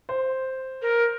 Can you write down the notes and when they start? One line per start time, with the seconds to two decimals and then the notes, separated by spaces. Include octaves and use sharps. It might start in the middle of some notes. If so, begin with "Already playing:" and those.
0.09 C5
0.82 A#4